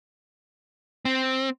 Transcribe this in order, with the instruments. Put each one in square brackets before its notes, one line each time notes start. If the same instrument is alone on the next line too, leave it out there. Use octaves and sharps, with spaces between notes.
[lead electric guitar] C4